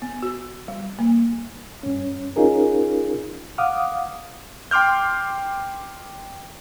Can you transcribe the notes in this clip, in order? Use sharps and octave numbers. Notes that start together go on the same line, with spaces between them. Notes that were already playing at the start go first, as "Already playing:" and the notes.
B3
F#4
G3
A#3
G2 C#4
C#4 D#4 F4 G#4 A#4
F5 F#5 D6 D#6 F6
G5 C6 D6 F6 G6